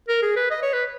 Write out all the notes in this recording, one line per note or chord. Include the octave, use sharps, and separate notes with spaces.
A#4
G#4
B4
D#5
C#5
B4